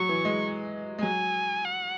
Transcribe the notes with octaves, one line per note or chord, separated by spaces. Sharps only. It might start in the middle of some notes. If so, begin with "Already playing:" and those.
Already playing: F#3 C#6
E3
G#3
G#3
F#3 G#5
F#5